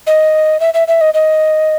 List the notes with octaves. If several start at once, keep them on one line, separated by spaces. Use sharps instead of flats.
D#5
E5
E5
E5
D#5
D#5